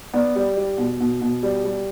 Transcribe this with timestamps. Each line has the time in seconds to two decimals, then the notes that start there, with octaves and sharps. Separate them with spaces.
0.13 B3 D5
0.36 G3
0.57 G3
0.78 B2
1.00 B2
1.21 B2
1.43 G3
1.65 G3